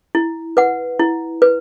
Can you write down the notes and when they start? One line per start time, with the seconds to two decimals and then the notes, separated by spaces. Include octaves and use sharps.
0.15 E4
0.57 B4 F#5
0.99 E4
1.42 B4